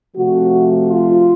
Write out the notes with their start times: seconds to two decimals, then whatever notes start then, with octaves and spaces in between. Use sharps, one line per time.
0.16 C3 F3 A3 F#4
0.90 F4